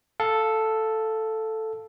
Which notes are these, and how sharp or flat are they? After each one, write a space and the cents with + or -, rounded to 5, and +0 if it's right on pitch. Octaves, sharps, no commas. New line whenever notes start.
A4 +0 F5 +0